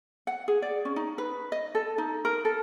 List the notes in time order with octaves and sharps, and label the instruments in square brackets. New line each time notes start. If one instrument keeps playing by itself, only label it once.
[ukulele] F#5
G#4
D5
C#4
D#4
B4
D#5
A4
D#4
A#4
A4